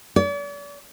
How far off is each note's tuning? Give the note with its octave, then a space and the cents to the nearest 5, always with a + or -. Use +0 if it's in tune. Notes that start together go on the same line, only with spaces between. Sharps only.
D5 -45